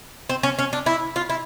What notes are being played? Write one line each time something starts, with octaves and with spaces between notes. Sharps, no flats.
C4
C#4
C#4
D4
E4
F4
E4